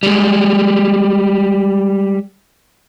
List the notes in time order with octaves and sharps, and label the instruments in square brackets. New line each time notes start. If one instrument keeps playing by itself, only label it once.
[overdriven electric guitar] G3 G#3